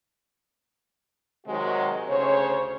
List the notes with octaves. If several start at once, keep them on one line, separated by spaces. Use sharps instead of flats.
C3 D#3 F#3 G#3 F#4
D2 C#3 C5 C#5